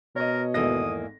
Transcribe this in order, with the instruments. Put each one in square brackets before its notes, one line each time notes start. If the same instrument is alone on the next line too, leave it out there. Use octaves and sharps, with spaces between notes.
[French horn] B2 [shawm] A#4 [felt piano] C#5 D#5
[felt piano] G#1 A4 A#6 [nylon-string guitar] E2 A#3 D#5 [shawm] D#6